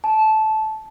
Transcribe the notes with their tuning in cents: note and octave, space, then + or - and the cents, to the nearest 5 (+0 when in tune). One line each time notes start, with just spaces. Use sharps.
A5 -15